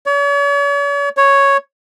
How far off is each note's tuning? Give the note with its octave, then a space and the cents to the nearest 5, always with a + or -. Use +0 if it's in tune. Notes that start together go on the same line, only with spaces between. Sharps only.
C#5 +45
C#5 +0